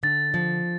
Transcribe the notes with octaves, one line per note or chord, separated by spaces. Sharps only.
D3 A6
F3